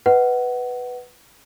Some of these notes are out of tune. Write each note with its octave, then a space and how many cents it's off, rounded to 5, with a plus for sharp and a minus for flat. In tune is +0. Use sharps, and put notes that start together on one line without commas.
B4 +0 D#5 +20 F#5 +15